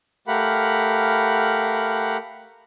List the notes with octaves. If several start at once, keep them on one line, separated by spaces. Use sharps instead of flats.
A3 G4 A#4 F5 F#5 B5